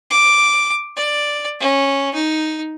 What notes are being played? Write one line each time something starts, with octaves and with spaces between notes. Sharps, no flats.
D6
D5
C#4
D#4